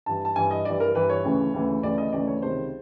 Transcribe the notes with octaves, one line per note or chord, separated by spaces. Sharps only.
G2 E3 A5
A5
G2 E3 G#5
D#5
G2 E3 D5
A#4
G2 E3 B4
C#5
D2 C#3 E3
D2 C#3 E3
D2 C#3 E3 D5
D#5
D2 C#3 E3 D5
C#5
C#2 C3 D#3 C5